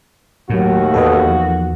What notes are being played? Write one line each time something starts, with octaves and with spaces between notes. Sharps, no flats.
G1 D#2 A2 F#3 F#4
E2 A4 B4 D#5
F3